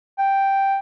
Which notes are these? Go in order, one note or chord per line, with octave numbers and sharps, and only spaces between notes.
G5